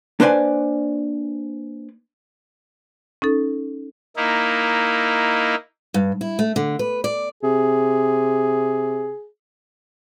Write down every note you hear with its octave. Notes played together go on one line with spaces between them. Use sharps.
A#3 D4 B4 C5 D5 G#5
C#4 D#4 A4
A#3 D#4 E4
G2
E4
A3
D3
B4
D5
C3 G#4